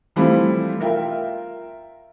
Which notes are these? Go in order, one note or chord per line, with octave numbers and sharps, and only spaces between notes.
E3 F3 G3 A3 C4 E4
F4 A#4 E5 G5